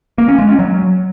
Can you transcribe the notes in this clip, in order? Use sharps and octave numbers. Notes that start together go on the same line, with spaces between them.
A#3
C#4
G#3
C#4
F#3